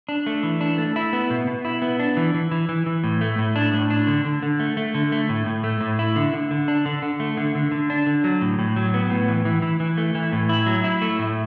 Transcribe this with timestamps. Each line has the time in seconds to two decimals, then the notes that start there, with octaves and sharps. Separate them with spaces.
0.09 D4
0.26 A3
0.43 E3
0.61 D4
0.78 A3
0.96 E4
1.13 B3
1.30 B2
1.47 B2
1.65 E4
1.82 B3
2.00 D4
2.17 E3
2.34 E3
2.51 E3
2.69 E3
2.86 E3
3.04 A2
3.21 A3
3.38 A2
3.56 D4
3.74 A2
3.90 D4
4.07 D3
4.25 D3
4.43 D3
4.60 A3
4.77 A3
4.95 D3
5.12 A3
5.29 A2
5.46 A2
5.64 A3
5.81 A2
5.99 E4
6.16 D3
6.33 D3
6.51 D3
6.68 D4
6.86 D3
7.02 D3
7.20 A3
7.37 D3
7.55 D3
7.72 D3
7.90 D4
8.07 D3
8.24 F#3
8.41 A2
8.59 A2
8.76 F#3
8.94 B3
9.10 A2
9.28 E3
9.45 E3
9.62 E3
9.80 E3
9.97 A3
10.15 E3
10.32 A2
10.49 E4
10.66 F#3
10.84 E4
11.02 A3
11.19 A2